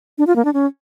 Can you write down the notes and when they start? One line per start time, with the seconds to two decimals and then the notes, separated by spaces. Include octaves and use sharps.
0.18 D4
0.27 F4
0.36 A#3
0.45 D4
0.54 C#4